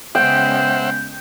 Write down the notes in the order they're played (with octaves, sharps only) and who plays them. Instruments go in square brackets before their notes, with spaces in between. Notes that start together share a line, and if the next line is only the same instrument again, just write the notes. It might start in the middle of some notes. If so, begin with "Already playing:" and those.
[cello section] C#3 G#3 B3 [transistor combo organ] C5 E5 F#5 [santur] G5